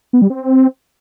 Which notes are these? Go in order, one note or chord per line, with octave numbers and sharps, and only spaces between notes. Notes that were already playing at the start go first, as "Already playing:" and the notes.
B3
G3
C4